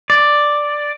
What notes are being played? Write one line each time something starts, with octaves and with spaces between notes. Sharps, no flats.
D5